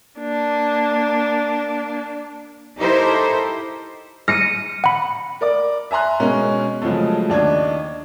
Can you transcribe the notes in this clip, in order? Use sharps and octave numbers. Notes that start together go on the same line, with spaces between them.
A#3 D4
D#4 E4 G4 A4 A#4 C5
F6 A#6 C#7 D#7
F#5 B5
A#4 D5 D6
E5 G#5 A#5 C6 F#6
B2 G#3 C#4 A#4
C#3 F3 F#3 G#3 A3
D#2 D4 D#4 G#6